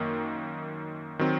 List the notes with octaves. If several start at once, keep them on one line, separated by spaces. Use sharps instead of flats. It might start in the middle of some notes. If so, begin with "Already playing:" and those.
Already playing: F#2 D#3 A#3
D#3 F#3 C4